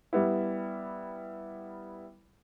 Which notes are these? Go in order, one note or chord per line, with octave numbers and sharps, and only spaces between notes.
G3 B3 E4